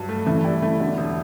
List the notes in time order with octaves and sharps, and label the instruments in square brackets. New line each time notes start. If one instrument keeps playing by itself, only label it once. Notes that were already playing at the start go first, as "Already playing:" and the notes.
Already playing: [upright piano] G2 F#3
A3
[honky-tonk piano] E3 [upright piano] A3
[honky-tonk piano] G3 [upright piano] E4
[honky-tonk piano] E3 [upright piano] A3
[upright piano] B2 [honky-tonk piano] D3
[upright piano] E1